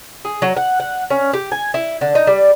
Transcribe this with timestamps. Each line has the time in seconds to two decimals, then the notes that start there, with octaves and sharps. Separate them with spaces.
0.25 G#4
0.42 F#3
0.57 F#5
0.80 F#5
1.10 C#4
1.33 G4
1.52 G#5
1.74 E4
2.01 D3
2.15 D#4
2.27 G3